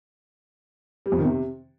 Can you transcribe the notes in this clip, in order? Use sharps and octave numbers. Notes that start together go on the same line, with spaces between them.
G3
F2
D#3
C3